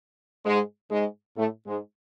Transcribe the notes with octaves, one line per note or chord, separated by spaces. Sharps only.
G#2 G#3
G#2 G#3
A2 A3
G#2 G#3